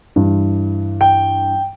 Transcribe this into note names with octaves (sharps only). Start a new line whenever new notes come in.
G2 E3
G5